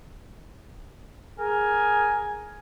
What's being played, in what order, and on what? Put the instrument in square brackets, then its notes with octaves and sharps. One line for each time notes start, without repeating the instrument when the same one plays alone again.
[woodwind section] G#4 A#4 [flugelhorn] G#5